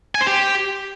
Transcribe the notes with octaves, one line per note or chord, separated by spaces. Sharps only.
G#5
C5
G4